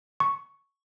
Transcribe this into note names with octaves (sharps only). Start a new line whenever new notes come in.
C#6